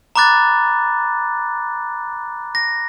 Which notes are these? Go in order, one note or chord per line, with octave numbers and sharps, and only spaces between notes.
A#5 B5 D6 F#6 A6
A#6